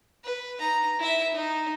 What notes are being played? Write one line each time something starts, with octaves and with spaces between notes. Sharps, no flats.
B4
D#4 A#5
E4 E5
D#4